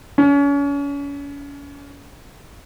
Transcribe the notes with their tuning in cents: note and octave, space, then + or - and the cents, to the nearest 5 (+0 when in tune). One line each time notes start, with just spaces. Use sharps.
C#4 +35